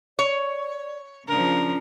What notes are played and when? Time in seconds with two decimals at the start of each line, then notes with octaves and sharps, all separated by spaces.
0.19 C#5 D5
1.28 C#3 F3 D4 A#4